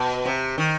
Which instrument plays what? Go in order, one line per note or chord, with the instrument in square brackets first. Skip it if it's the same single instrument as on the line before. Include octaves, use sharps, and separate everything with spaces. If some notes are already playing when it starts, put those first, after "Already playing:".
Already playing: [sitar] B2
C3
D#3